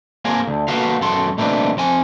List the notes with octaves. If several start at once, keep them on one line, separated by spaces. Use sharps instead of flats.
A#3 C4 G#4 A#4
D2
A#3 B3 F#4 A4 B4 F5
F#2 B2 A4 C6
B2 A3 A#3 C4 D4 B4
F2 C4 G#5